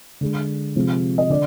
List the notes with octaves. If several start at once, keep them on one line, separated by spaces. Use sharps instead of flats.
D3 G#3
C3 F3 G#3
D#5
D3 D5